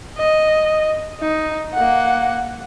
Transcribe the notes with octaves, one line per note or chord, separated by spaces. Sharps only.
D#5
D#4
A#3 F#5